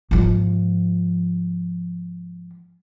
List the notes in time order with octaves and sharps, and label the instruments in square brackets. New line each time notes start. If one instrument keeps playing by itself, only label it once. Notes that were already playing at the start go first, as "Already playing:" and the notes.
[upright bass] G#2 F3